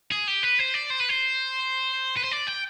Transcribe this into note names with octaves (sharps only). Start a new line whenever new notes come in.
G#4
G4
B4
C5
D5
C5
B4
C5
B4
C5
D5
G5